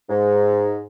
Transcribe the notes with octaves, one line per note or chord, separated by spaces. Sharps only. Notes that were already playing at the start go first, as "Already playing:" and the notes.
G#2